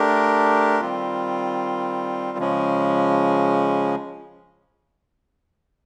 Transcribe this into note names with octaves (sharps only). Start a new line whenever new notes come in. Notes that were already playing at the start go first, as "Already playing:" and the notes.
Already playing: A3 D4 G4 A#4
D#3 G3 C4 F4
C#3 F3 G#3 C#4